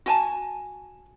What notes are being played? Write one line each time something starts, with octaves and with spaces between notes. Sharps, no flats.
F#4 G#5 A5